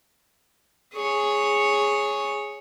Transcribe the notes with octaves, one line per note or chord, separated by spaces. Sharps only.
G#4 C#5